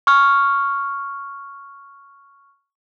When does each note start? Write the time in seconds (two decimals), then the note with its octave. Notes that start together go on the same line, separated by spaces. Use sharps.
0.07 C#6 F6